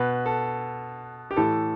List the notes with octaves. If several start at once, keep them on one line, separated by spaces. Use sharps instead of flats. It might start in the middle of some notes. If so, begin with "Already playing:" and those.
Already playing: B2 B4
A4
G4
A2 E3 A4